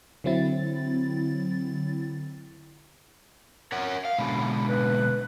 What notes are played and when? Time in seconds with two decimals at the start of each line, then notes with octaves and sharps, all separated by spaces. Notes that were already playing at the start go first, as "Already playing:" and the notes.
0.24 D3 F#3 C4 E4 A6
3.72 A#4 C#5 F#5
4.05 F5
4.18 B2 D3 G#3 B5
4.67 B4